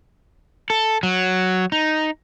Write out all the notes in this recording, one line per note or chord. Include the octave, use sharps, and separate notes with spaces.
A4
F#3
D#4